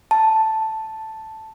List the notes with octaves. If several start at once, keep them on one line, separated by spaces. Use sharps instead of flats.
A5